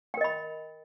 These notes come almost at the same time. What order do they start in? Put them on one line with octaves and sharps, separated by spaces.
G5 A#4 D#5 B5